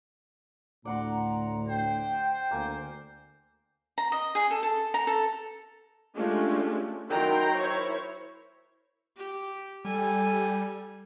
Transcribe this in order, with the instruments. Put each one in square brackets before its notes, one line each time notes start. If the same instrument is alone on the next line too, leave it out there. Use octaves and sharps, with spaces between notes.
[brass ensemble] D2 A2 [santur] D5 F#5 C6 [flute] A#5
[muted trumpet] C5 [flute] G5
[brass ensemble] D2 [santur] A#3 A#4 G#5
[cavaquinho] A#5
D#5
G#4
A4
A4
A#5
A4
[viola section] G#3 A3 C#4 D4 F4 G4
D#3 F#3 E4 G5 A#5 C6
E4 A#4 C5 C#5
[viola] G4
[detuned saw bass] G3 [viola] A4 G#5